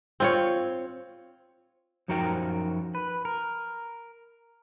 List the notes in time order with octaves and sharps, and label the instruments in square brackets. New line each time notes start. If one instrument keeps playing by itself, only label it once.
[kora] C4 F4 C#5
[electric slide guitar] F#2 F3 D#4 F#4 A#4 G5
B4
A#4